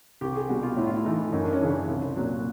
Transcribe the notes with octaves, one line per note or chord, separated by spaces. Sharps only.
C2 G4
G#4
B2 G3 F#4
F4
A2 E4
F4
E4
E3 A3 D#4
F#2 D#4
D4
C#4
C#3 E3 D4
C2
A#2 F#3